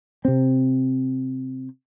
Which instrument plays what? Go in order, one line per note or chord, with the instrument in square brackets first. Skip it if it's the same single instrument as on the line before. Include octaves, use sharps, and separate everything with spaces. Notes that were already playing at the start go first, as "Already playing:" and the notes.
[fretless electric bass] C3 C4